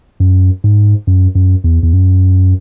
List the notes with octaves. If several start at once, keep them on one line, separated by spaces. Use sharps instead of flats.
F#2
G#2
F#2
F#2
E2
E2
F#2